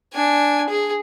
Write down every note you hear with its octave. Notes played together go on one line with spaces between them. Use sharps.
D4 G#5
G#4